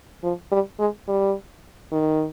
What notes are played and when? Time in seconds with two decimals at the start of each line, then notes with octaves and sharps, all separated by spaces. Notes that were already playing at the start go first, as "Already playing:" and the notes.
0.23 F3
0.51 G3
0.79 G#3
1.08 G3
1.92 D#3